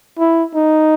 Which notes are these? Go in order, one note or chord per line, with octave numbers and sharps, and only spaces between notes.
E4
D#4